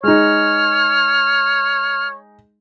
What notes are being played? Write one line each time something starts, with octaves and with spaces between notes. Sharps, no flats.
G#3 D#4 C#5 F6